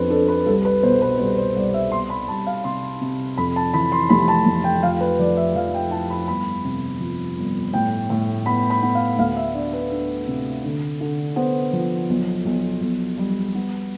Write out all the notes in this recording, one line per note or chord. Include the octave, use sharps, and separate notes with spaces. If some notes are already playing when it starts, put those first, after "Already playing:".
Already playing: F2 B3 D4 B4 C5
D4 A4
B4
C2 A4
B4
B2 C5
B4
C2 C5
C5
C2 D5
E5
B3 C6
B5
C2 A5
F5
C3 C6
C3
F2 B5
A5
E3 B5
C6
F1 B5
A5
F1
G5
F3 F5
B4
F3 D5
E5
F3 F5
G5
E4 A5
B5
G1 B5
C3
F3
G1
A2 G5
A2
B3 B5
B5
B3
F5
D2 F5
E5
D4 D5
B4
D4
C3
D3
D3
B3 C5
F3
B1
B1
B1
G3
B3